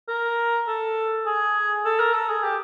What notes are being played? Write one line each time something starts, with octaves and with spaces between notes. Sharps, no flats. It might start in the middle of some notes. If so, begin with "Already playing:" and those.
A#4
A4
G#4
A4
A#4
A4
G#4
G4